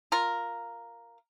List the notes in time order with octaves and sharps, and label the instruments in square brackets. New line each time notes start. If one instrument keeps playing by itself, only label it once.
[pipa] F4 A#4